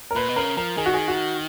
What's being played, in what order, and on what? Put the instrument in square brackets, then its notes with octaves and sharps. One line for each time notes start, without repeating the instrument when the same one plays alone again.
[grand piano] A#4
[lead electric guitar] A#2 [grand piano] B4
[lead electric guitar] B2
[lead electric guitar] C#3 [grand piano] A#4
[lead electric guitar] F3 [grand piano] A#4
[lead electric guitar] D#3 [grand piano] G#4
[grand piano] F#4
G#4
F#4